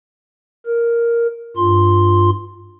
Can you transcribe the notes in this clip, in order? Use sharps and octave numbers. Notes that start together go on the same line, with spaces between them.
A#4
G2 F4 C6